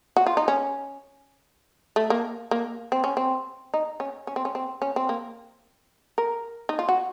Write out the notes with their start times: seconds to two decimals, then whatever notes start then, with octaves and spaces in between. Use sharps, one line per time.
0.16 F#4
0.26 F4
0.37 D#4
0.48 C#4
1.96 A3
2.10 A#3
2.51 A#3
2.92 C4
3.04 C#4
3.17 C4
3.74 D#4
4.00 C#4
4.27 C#4
4.36 C4
4.45 C#4
4.55 C4
4.82 C#4
4.96 C4
5.09 A#3
6.18 A#4
6.69 D#4
6.79 F4
6.89 F#4